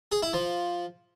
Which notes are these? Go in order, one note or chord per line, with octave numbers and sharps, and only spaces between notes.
G#4
E4
F3